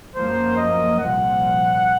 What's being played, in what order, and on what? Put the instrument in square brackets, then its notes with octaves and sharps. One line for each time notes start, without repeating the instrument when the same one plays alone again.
[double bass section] F#2 F3 A#3 [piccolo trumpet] C5
[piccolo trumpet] D#5
[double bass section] C2 A#2 F3 [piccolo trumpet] F#5